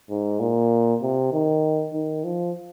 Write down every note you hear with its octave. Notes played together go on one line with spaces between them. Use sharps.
G#2
A#2
C3
D#3
D#3
F3